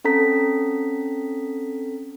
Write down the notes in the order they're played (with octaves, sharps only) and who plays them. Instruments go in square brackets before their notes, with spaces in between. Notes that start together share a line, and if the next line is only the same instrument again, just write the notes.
[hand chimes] C4 C#4 A4 A#5 B6